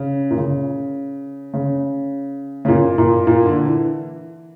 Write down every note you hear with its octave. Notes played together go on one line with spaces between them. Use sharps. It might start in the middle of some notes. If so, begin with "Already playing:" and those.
Already playing: C#3
A#2
C#3
C#3
C#3
A#2
A#2
A#2
D3
E3